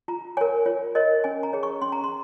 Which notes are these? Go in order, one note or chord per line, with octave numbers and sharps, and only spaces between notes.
F4 A#5
A#4 C#5 G#5
F4 C#5
A#4 C#5 D#5
C#4 G#5
A#5
G#4 C#5
C#6
C#4 C6
A#5
C6